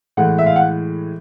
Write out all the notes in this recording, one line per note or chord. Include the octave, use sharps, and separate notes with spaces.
A2 E3 G#3 F#5
E5
F5
F#5